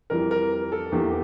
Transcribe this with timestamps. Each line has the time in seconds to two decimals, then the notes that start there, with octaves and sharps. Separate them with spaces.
0.10 F2 E3 G3 A#4
0.31 A#4
0.72 A4
0.92 E2 E3 A#3 G4